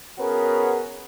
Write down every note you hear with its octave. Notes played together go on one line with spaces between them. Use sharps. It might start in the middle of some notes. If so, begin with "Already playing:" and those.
B3 C#4 F#4 G#4 A#4 B4